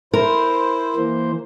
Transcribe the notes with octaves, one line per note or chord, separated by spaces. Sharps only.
E4 A#4 C5
E3 A#3 C5